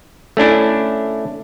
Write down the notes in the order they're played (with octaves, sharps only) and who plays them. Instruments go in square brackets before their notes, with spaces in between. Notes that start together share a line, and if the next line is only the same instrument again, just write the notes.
[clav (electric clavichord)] A3 C#4 D4 E4